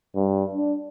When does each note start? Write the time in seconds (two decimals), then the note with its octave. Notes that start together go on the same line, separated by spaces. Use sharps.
0.15 G2
0.55 D4